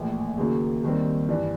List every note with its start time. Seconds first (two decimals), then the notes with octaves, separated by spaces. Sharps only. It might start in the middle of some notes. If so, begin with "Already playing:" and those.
Already playing: A#1 A2 E3
0.38 D#2 C#3 F#3 A#3
0.83 D#2 D#3 G3 C4
1.29 G2 E3 G3